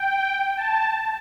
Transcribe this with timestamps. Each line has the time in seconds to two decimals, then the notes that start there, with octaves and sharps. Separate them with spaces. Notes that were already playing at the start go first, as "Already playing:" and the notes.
Already playing: G5
0.57 A5